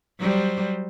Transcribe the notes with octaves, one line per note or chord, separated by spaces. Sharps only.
F#3 G3 C5